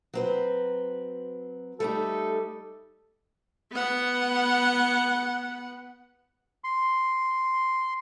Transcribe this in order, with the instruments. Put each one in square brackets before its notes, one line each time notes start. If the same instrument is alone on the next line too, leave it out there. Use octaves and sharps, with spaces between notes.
[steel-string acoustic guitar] F#3 C4 B4
[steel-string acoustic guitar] G3 A3 D#4 [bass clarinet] A4
[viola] B3 F#5
[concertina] C6